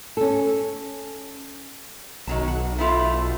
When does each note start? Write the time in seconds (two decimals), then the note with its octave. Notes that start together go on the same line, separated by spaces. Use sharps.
0.17 C#4 A4
2.27 B1 D#3 F#3 A5
2.48 F#5
2.78 A3 E4 F4